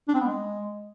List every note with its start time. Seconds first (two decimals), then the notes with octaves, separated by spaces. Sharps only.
0.08 D4
0.14 C4
0.21 B3
0.27 G#3